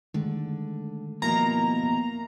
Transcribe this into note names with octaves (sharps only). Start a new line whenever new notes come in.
D3 D#3 G#3 A3
B2 F3 A#3 E4 A#5